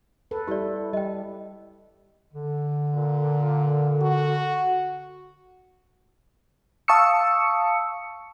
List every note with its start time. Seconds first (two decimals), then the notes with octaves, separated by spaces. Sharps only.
0.31 A4 B4
0.48 G3 E4 G4 D5
0.93 G3 D#5 G5
2.33 D3
2.95 A#2
4.02 F#4
6.88 F5 A5 C#6 D#6 E6 C#7